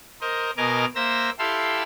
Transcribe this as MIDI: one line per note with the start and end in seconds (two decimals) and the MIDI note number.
0.21 0.51 70
0.21 0.51 72
0.21 0.51 75
0.57 0.85 47
0.57 0.85 70
0.57 0.85 75
0.57 0.85 80
0.57 0.85 86
0.57 0.85 89
0.95 1.30 58
0.95 1.30 72
0.95 1.30 76
0.95 1.30 88
0.95 1.30 94
1.39 1.83 64
1.39 1.83 67
1.39 1.83 69
1.39 1.83 77
1.39 1.83 84
1.39 1.83 88